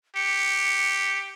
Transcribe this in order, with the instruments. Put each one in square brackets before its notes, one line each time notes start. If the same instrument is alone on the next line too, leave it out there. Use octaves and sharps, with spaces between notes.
[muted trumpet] G4 [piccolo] C#7